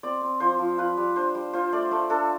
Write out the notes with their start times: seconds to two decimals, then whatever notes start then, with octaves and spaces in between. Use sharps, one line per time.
0.03 C4 D5
0.21 C4
0.40 F3 C5
0.59 F3
0.78 F4 B4
0.97 G3
1.15 D4 C5
1.35 G3
1.53 F4 C5
1.73 A3 D5
1.91 A3 C5
2.10 D4 A4